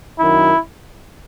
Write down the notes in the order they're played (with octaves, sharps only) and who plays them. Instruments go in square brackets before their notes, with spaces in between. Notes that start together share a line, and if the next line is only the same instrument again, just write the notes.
[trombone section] F#2 D#3 F#3 E4